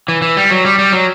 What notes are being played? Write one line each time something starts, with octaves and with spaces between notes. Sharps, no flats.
E3
E3
G3
F#3
G3
G3
F#3